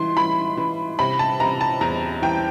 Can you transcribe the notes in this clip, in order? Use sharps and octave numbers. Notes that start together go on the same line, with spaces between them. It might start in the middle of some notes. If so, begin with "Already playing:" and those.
Already playing: E3 C6
E3 B5
E3
C3 B5
A5
C3 A#5
A5
E2 A#5
E3 G5